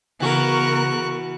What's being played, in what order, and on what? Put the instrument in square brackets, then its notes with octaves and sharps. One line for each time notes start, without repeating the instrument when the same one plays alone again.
[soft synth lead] C#3 [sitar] E3 F#4 [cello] B3 A#4 [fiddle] C#6 F#6